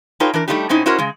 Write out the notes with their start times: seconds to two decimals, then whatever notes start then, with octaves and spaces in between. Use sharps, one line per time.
0.20 D#4 F4 A4 B4 C#5 G5
0.34 E3 D4 A#4
0.48 G3 A3 C4 D4 D#4 G4
0.69 B2 C4 C#4 D#4 E4
0.86 C#4 E4 F#4 A#4 C5 C#5
0.99 C#3 G#3